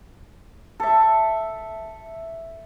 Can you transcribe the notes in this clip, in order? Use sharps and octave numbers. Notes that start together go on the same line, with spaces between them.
A4 E5